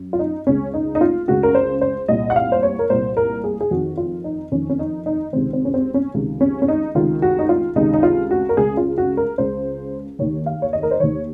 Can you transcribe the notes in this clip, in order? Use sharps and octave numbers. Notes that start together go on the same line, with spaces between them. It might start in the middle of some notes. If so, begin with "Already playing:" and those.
Already playing: F#2
F4
D#4
C#2 C#3 C#4
D#4
D#4
F4
C#2 C#3 F#4
A#4
C5
C5
C2 A#2 D#5
F#5
F5
C5
C#5
A#4
C2 A#2 C5
A#4
G#4
G#4
F2 D#3 F#4
F4
D#4
F2 D#3 C#4
C#4
D#4
D#4
C#2 C3 D#3 C4
C4
C#4
C4
C#4
C#2 C3 D#3
C#4
C#4
D#4
C#2 C3 D#3 F4
F#4
D#4
F4
C#2 C3 D#3 D#4
D#4
F4
F#4
A#4
C#2 C#3 G#4
F4
F#4
A#4
C#2 C#3 C5
D#2 D#3 C#5
F5
C#5
D#5
A#4
C5
D#2 D#3 C#5